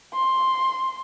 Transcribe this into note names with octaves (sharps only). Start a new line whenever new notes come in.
C6